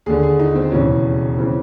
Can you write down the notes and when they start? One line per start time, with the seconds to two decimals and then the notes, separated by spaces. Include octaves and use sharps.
0.06 D#2 D3 G#4
0.23 G#4
0.39 D#4
0.55 C4
0.72 E1 D#2 C#3 E3 C#4
1.38 C#3 E3 C4